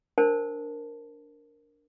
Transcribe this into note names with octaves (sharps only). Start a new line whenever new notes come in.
D4 A#4 C5 A5